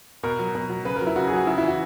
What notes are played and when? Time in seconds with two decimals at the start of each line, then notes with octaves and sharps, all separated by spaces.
0.23 B2 A#4
0.39 F#3
0.55 B2
0.69 F#3
0.85 C#3 B4
0.96 A#4
1.01 F#3
1.07 E4
1.16 C#3 F#4
1.27 G#4
1.32 F#3 F#4
1.47 C#3 E4
1.58 E4
1.63 E3
1.68 F#4